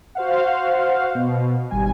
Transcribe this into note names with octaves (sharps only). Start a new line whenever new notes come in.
F#4 C5 F5 F#5
B2
G#1 G3 G#5